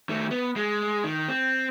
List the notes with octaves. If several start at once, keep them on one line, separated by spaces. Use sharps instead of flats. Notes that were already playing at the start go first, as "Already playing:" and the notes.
D#3 A3
B3
G#3
D#3
C4